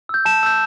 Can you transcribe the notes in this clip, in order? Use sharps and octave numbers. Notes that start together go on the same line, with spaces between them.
E6 G6
A5 E7
E6 G6